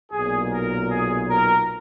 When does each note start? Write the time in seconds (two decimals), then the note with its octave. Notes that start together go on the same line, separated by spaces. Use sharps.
0.12 B1 A#2 G#4
0.51 A#4
0.89 G#4
1.28 A#4